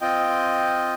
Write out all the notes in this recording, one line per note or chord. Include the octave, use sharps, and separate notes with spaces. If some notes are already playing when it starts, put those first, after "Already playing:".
C4 F4 D#5 G5